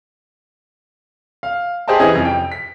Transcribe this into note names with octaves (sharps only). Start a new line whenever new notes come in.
F5
G4 G#4 C5 D#5 G5 A5
E3 C#4 G#4 D#5
F2 C3
G5
B6